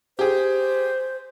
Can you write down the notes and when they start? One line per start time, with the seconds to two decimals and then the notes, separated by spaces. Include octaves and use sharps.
0.19 G4 G#4 C5